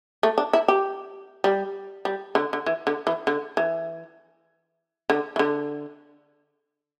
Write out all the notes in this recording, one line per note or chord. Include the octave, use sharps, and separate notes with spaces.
A3
D4
E4
G4
G3
G3
D3
D3
E3
D3
E3
D3
E3
D3
E3
D3